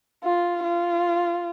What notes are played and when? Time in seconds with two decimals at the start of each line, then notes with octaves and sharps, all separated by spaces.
0.24 F4
0.64 F4